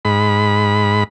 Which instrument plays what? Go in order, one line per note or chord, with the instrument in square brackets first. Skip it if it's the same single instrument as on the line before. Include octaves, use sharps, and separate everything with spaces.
[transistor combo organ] G#2 B5